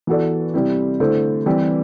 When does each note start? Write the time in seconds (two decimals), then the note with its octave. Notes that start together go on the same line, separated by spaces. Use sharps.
0.07 E3 B3 F#4 A4 D5
0.54 C3 G3 C4 E4
1.00 D3 A3 E4 A4 C5
1.46 E3 G3 C4 G4